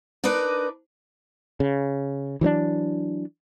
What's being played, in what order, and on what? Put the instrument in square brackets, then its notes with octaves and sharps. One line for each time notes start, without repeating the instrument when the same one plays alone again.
[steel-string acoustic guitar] D4 D#4 A#4 B4 D5
[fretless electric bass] C#3
E3 F#3 C4 D4